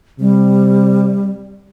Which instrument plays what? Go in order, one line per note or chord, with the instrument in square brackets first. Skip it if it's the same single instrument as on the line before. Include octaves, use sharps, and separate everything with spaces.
[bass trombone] C3 [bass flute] G3